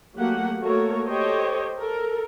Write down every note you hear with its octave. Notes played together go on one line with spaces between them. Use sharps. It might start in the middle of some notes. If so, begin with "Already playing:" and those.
F#3 A3 A#3 G4 F#5
A3 A#3 F#4 A4 A#4 C#5
G4 A4 C5 C#5 D#5 G5
A4 A#4